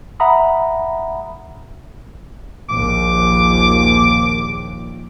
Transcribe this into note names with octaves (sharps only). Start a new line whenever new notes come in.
E5 F#5 A#5 B5 D#6
A#1 D#2 A#2 D6